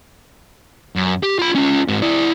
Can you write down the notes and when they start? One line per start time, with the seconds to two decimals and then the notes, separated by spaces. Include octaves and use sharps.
0.96 F#2
1.23 G4
1.39 F4 B5
1.55 C#4 F4
1.88 G#2 F#4
2.02 E4 D5